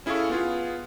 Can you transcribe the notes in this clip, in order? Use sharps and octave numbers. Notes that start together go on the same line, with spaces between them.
C#4 E4 G#4 A4 F5 C#6
B3 F4 G#4